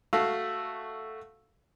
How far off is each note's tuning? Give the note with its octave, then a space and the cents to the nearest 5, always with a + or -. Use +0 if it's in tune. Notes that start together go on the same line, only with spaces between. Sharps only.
A3 +0 F#4 +0 F5 -5